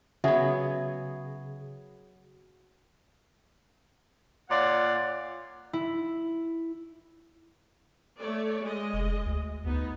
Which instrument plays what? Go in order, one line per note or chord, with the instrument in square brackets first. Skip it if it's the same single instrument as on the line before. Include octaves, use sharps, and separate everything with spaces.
[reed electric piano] C#3 G#4 G#6 [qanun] F#3 B3 [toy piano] E5
[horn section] A#2 C#5 D5 F5 F#5
[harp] E4
[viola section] A3 C#5 D5
G#3 D#5
[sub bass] F1
D2
[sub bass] D2 [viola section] B3 D#4